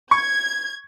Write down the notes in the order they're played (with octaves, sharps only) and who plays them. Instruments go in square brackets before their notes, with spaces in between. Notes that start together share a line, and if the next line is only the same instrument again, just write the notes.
[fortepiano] C#6 [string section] G#6